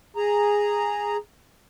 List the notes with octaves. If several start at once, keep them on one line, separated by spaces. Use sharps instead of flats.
G#4 A#5